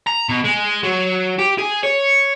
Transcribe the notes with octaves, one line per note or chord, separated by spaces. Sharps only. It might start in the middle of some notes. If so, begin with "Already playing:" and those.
A#5
B2
G#3
F#3
G4
G#4
C#5